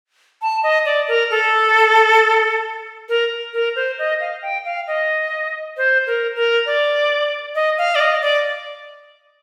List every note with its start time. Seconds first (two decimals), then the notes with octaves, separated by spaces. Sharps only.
0.42 A5
0.63 D#5
0.86 D5
1.08 A#4
1.31 A4
3.09 A#4
3.54 A#4
3.76 C5
3.99 D#5
4.20 F5
4.42 G5
4.65 F5
4.87 D#5
5.77 C5
6.07 A#4
6.36 A#4
6.66 D5
7.55 D#5
7.78 F5
7.95 D5
8.00 D#5
8.22 D5